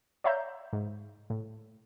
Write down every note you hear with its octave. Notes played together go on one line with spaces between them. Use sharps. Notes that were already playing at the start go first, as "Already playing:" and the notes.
C#5 D5 E5 F5 A#5 G6
G#2
A2